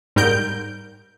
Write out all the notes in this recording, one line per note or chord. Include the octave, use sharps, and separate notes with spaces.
G#2 G3 A#4 G6 D7